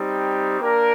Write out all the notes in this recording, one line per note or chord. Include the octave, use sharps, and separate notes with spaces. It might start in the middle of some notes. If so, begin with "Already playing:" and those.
Already playing: G3 C4 D#4 G4
A#3 D4 G4 A#4